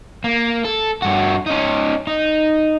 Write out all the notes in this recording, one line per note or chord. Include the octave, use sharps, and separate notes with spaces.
A#3
A4
G2 F#4
C#4 D#4
D#4